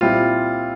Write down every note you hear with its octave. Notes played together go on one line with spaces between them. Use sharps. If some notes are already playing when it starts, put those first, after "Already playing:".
A#2 G3 C4 E4 F4